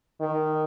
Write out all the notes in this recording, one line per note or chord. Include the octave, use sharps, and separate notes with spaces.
D#3